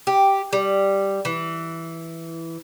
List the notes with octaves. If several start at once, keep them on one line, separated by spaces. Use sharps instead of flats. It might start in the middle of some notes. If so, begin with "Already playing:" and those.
G4
G3
E3